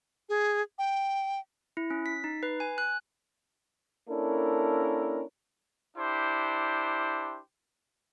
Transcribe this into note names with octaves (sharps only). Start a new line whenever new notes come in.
G#4
G5
E4
C#4
B6
D#4
B4
G#5
F#6
A#3 C#4 D4 E4 A4 A#4
D4 E4 G4 C5